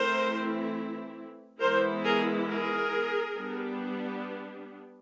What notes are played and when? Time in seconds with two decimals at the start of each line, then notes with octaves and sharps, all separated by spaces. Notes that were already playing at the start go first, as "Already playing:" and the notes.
Already playing: E3 A3 C4 E4 A#4 C5
1.61 E3 G#3 B3 E4 A#4 C5
2.05 G#4 A#4
2.49 G#4 A#4
3.37 G3 B3 D4